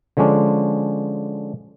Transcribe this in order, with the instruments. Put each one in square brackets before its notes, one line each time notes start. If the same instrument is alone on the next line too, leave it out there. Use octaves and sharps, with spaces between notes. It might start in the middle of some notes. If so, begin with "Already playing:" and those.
[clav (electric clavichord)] D3 F3 G#3 C#4 D4